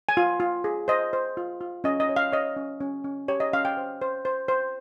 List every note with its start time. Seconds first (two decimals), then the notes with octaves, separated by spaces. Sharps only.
0.09 G#5
0.17 F4
0.40 F4
0.64 G#4
0.88 C5 D#5
1.13 C5
1.37 F4
1.61 F4
1.84 C#4 D#5
2.00 D#5
2.09 C#5
2.16 F5
2.32 C#5 D#5
2.57 C#4
2.80 C#4
3.04 C#4
3.28 G4 C#5
3.40 D#5
3.53 C#4 F5
3.65 G5
3.77 C5
4.01 C5
4.25 C5
4.48 C5